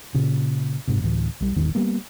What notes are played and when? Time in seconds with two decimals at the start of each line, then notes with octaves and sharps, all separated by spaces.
0.15 A#2 C#3
0.88 F#1 G#2 C3
1.02 D2 A2 E3
1.41 B1 G3
1.56 D#1 G#1 E2 D#3
1.75 G3 A#3 B3